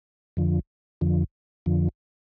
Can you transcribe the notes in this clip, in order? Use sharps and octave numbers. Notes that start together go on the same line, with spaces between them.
F2 D3 F3
F2 D3 F3
F2 D3 F3